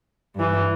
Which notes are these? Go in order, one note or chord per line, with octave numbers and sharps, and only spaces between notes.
G2 E3